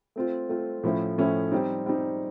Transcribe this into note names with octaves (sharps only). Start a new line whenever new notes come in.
A3 C4 F4
A3 C4 F4
A2 F3 A3 C#4 E4
A2 F3 A3 C#4 E4
G3 C4 D#4
G3 C4 D#4